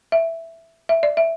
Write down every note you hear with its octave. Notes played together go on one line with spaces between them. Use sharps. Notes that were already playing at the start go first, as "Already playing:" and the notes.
E5
E5
D5
E5